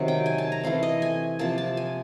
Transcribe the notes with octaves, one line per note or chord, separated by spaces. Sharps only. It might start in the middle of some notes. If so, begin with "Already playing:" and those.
Already playing: C3 D#3 F#3
G5
G#5
A5
A#5
E3 A3 C4 F5
D#5
G#5
C3 F3 A#3 A5
A5
G#5